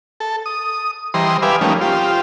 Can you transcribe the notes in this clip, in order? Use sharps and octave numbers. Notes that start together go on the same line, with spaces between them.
A4
D#6
E3 G3 C5 D#5 A#5 C6
G4 B4 D5 E5 F5 G#5
F3 G3 A3 A#3 C#4 D#4
F4 G4 C5